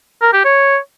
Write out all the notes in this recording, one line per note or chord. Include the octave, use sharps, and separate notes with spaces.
A#4
G4
C#5